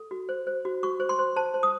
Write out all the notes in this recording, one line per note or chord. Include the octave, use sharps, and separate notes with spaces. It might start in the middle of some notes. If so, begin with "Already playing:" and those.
Already playing: A4
F#4
C5
C5
F#4
F#4 C#6
C5
C6
C5
C5 A5
C5
D#6